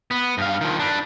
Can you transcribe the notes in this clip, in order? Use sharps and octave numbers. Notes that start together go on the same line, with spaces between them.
B3
G2 F5
D#3 F3
D4 B4